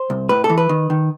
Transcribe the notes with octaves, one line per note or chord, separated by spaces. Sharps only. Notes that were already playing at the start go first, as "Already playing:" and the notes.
Already playing: C5
C2
A2 B4
A4
E3
B4
D#3
D#3